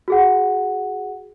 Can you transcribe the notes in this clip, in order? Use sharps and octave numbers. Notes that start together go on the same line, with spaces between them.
F#4 G#4 F#5